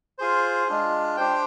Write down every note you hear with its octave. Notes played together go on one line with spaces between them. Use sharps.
F4 G#4 C5
G#3 D4 F4
D4 G4 C5 G5